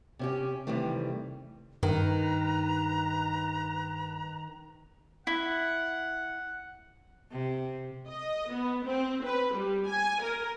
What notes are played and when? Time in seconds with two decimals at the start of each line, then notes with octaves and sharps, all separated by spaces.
0.19 C3 C#4 G4
0.67 C3 D#3 E3 G3 A3
1.83 G2 D#3 B4 A#5
5.27 E4 F#5
7.31 C3
8.08 D#5
8.52 B3
8.86 C4
9.25 B4
9.54 G3
9.87 G#5
10.23 A#4